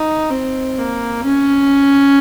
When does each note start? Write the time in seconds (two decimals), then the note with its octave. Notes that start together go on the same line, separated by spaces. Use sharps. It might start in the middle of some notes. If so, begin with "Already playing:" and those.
Already playing: D#4
0.30 C4
0.78 A#3
1.24 C#4